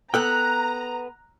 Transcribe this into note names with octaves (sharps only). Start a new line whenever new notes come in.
B3 A4 G5 A#5 F#6